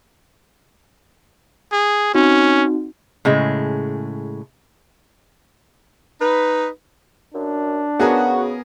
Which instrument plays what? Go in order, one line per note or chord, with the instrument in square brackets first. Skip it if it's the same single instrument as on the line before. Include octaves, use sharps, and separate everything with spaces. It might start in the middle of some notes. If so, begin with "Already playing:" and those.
[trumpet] G#4
[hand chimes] C4 D#4 F#4 [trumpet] C#4
[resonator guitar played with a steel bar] A2 C#3 G#3
[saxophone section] D#4 B4
[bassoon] F#2 [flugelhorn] D4
[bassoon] C#3 [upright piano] B3 G#4 A#4 [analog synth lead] F#4